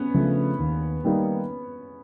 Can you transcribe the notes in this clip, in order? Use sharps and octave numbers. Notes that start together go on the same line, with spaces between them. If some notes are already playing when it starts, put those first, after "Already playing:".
Already playing: B3 C#4
C#3 F3 A3 D4
D#2
D#3 G3 A#3 D#4